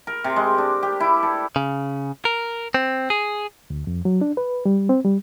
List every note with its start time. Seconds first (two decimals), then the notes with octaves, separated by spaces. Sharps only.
0.07 A#4
0.24 C3
0.36 G#3
0.58 D4
0.83 G4
1.00 E4
1.23 A4
1.56 C#3
2.25 A#4
2.74 C4
3.10 G#4
3.70 D2
3.87 F2
4.05 F#3
4.21 D4
4.37 B4
4.66 G3
4.89 C4
5.05 G3